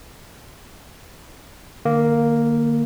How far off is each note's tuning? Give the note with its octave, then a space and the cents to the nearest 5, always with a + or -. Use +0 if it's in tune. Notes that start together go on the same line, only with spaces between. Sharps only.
D3 +45 A#3 +0